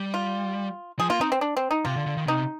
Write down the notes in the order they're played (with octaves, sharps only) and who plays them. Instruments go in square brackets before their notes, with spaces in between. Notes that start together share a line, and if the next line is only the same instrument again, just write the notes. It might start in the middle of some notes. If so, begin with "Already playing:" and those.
Already playing: [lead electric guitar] G3
[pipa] F4
[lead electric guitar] F3 [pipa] G#4
[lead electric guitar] A#3 [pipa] F4
[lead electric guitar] C4 [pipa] D#4
[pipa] C4
D4
C4
D#4
[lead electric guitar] C3 [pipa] F4
[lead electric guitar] D3
D3
D#3
[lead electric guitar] C3 [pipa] D#4